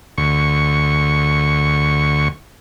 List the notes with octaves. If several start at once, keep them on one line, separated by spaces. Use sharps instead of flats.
D2 C#6